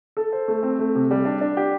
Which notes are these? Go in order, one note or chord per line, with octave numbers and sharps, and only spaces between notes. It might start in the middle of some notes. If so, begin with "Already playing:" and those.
A4
C5
A3
C4
A3
C3
G3
D4
D4
G4